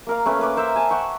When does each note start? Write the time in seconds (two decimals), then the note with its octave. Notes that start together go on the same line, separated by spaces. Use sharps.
0.07 A#3 A#4 F5
0.26 A3 C#4 B4
0.39 A#3 B4 D6
0.57 A#4 C5 E5
0.76 G#5 A5
0.91 F#5 G5 C#6